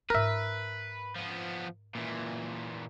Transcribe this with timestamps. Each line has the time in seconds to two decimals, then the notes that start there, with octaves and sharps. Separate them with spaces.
0.10 G#2 F4 A#4 B4 E5
1.16 F3 B3
1.95 A#2 E3